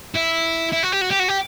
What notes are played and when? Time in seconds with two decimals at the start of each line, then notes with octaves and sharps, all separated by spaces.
0.16 E4
0.72 E4
0.83 F#4
0.92 G4
1.01 F#4
1.11 G4
1.20 F#4
1.29 G4